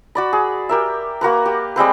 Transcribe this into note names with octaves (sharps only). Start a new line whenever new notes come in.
F#4 D5 B5
G#4
G4 A#4 E5
A#3 F#4 A#4 B4
G4
G3 G#3 C4 B4